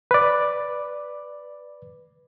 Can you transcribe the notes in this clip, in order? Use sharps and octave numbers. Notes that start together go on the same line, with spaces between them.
B4 D5